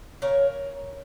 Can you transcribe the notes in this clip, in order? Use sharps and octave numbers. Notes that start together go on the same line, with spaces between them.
C#3 A#4 C#5